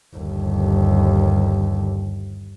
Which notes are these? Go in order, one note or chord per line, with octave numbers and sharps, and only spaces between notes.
G1 D#2